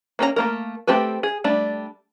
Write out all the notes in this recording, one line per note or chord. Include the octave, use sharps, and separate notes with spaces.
A#3 C#4 D4 A#5
A3 A#3 A#4
A3 C4 G4 A4 B4
G#4
G3 A3 D4